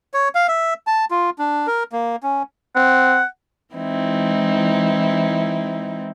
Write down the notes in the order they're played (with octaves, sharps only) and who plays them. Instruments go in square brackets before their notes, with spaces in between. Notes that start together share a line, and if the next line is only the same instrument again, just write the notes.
[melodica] C#5
F5
E5
A5
F4
D4
A#4
A#3
C#4
[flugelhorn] C4 [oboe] F#5
[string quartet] E3 G#3 C4 D#4 E4